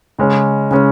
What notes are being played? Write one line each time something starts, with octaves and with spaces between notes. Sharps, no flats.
C#3 G#3 C#4
C#3 G#3 C#4